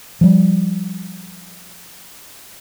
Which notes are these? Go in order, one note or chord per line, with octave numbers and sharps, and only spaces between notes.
F3 G3